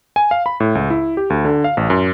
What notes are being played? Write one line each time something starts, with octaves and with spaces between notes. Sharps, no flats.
G#5
F5
B5
A2
C#2
E4
G4
D2
D3
F5
A1
F#2